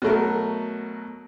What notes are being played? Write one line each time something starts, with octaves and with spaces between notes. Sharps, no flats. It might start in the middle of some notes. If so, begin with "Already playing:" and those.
B2 F#3 A3 A#4